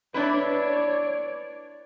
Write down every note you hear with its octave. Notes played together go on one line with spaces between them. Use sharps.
D4 E4 B4 C#5 D5